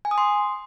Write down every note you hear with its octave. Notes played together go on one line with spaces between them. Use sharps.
G#5
D#6
C6